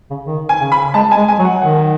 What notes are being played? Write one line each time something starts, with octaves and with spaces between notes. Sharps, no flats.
C#3
D#3
G#5
C#3
B5
G#3 A5
G#5
G#3
G#5
F#3
F#5
D#3 F#5